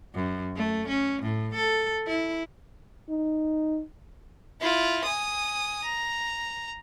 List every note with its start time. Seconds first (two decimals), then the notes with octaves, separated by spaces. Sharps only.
0.15 F#2
0.56 A3
0.89 C#4
1.23 A2
1.54 A4
2.07 E4
3.09 D#4
4.61 E4 F4
5.04 G#5 D#6
5.84 A#5